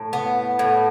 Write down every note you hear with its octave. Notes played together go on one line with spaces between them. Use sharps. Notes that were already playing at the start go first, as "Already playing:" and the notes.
Already playing: A2
B3
A2